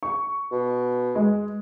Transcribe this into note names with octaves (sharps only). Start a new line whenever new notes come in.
C#6
B2
G#3